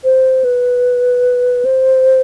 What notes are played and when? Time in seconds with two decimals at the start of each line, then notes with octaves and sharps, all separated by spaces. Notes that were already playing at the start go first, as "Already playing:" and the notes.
0.04 C5
0.44 B4
1.65 C5